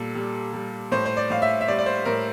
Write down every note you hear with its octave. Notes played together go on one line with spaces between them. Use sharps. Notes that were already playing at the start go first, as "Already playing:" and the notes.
Already playing: A#2 G3 A4
G3
G3
A2 C5
C5
D5
A2 F5
E5
E5
G3 D5
D5
C5
A2 A#4